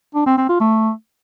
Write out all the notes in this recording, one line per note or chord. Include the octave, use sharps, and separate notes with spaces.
D4
C4
C4
F4
A3